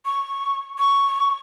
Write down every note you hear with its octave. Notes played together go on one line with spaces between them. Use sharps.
C#6
C#6